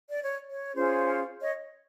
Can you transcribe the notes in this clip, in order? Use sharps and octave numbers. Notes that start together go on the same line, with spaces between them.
D5
C#5
C#5
C#4 F4 G#4 C5
C#5 D#5